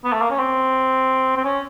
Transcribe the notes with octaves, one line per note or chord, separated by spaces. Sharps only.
B3
A3
A#3
C#4
C4
C4
C#4